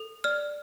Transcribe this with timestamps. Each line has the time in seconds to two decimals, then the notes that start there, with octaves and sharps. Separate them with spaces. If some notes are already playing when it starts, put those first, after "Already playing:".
Already playing: A4
0.24 D5 F6